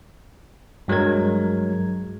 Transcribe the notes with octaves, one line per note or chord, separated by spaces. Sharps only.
G2 F#3 G#3 A#4 G#6